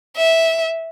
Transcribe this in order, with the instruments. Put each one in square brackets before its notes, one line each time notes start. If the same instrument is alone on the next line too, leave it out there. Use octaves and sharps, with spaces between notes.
[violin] E5